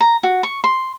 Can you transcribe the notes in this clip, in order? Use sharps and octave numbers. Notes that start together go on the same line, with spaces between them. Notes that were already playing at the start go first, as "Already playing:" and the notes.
A#5
F#4
C#6
C6